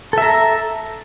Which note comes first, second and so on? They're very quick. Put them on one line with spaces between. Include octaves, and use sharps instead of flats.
A4 E5 A#5